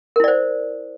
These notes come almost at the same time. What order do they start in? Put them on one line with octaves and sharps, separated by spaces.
A#4 E4 D5 C5